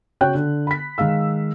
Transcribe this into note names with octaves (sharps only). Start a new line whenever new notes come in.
C#3 F#4 C#5 G5 F#6
D3
B5 B6
D#3 G#3 F5 E6